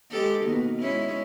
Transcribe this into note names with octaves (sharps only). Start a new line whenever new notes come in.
G#3 G4 A4
B2 D#3 A#3
G#3 C#4 E4